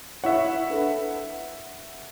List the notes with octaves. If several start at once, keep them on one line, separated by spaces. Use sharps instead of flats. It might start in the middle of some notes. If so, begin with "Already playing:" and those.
E4 C#5 E5 F#5
D4 A4 B4